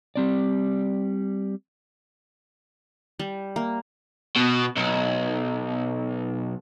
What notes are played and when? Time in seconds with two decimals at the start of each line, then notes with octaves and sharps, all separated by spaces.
0.16 G3 C4 D5
3.19 G3
3.56 A#3
4.36 B2
4.77 B1